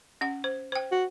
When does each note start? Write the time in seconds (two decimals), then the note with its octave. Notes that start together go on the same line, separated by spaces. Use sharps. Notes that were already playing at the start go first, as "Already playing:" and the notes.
0.21 C#4 F#5
0.44 C5
0.72 C5 G5
0.92 F#4